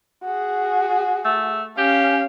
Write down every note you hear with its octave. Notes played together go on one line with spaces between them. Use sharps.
F#4 G#4
A3
C#4 G4 F5